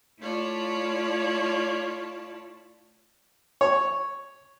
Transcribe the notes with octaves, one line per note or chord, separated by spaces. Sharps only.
A3 E4 F4 C#5 D5 A5
C#5